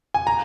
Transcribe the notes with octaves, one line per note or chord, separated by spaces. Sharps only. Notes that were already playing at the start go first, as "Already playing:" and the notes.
G#5
A#5